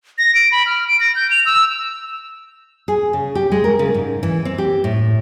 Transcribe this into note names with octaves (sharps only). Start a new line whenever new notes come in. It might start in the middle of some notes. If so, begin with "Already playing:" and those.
A#6
D7
B5
F6
D7
A#6
G6
F7
E6
G#4
C#3
G4
G#3
A#4
C#3
G#2
E3
C4
G4
A2